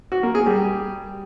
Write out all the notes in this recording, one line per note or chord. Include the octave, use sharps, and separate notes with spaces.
F#4
A#3
G#4
G3